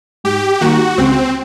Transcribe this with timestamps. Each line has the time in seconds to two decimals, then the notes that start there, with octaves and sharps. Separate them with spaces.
0.24 G#2 G4
0.61 D#3 G3 A#3 D#4 F#4
0.98 C#2 C4